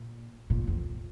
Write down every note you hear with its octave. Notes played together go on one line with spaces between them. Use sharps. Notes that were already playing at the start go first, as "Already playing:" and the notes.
Already playing: A#2
A#2
F2